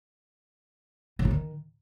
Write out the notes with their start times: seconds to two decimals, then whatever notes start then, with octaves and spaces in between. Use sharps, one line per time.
1.19 C#3
1.25 C3
1.31 D#3